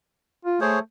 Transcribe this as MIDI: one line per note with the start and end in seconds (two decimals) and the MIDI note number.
0.45 0.58 65
0.61 0.79 57
0.61 0.79 68
0.61 0.79 72
0.61 0.79 73